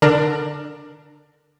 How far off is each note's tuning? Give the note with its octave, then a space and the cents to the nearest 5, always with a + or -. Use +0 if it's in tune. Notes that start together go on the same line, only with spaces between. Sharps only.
D3 +0 D4 +20 A#4 +0